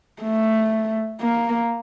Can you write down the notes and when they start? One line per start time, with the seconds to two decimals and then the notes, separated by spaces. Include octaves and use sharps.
0.22 A3
1.21 A#3